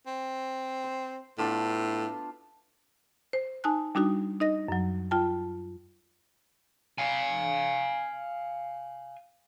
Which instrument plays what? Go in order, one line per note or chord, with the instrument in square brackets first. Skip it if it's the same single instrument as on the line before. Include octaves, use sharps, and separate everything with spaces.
[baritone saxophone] C4
[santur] C5
[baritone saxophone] A2 [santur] B3 D4 F4
[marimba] C5
D#4 G#5 A5 F#6
G3 D4 D#4 F#4 D#6
D#4 D#5 A#6
F#2 F#3
F4 G5 A5
[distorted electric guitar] F5 G#5